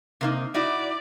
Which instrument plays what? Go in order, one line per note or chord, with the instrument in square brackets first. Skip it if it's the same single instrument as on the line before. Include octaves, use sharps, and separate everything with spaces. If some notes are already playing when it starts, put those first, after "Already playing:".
[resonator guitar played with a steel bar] C3 A#3 D#4
[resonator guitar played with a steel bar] D#4 E4 F#4 [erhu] D5